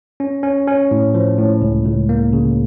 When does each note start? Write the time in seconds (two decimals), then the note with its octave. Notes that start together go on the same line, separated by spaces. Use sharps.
0.20 C#4
0.43 C#4
0.67 C#4
0.91 A2
1.14 F3
1.38 A2
1.62 C#2
1.86 C#2
2.09 A#3
2.33 C#3